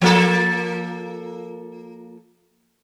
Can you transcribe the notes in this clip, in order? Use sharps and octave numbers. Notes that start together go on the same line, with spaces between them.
F3 A#3 A4